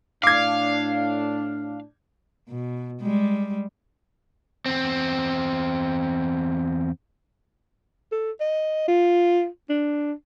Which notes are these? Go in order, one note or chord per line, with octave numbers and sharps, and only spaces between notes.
A2 D4 F5 D6 G#6
B2
G3 G#3
E2 C4
A4
D#5
F4
D4